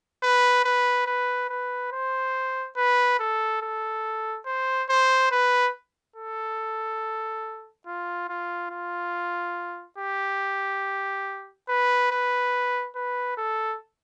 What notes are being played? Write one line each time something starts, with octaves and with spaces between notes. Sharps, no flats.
B4
B4
B4
B4
C5
B4
A4
A4
C5
C5
B4
A4
F4
F4
F4
G4
B4
B4
B4
A4